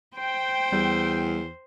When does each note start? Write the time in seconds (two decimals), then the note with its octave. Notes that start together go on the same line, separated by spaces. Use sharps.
0.17 C5 G5
0.72 E2 G3